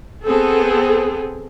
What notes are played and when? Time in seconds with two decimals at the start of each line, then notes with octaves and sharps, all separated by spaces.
0.24 B3 C4 G#4 A4